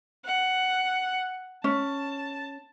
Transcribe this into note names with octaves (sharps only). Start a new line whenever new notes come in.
F#5
C#4 A5